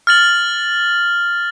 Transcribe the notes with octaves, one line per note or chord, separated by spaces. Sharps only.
F6 A6 F#7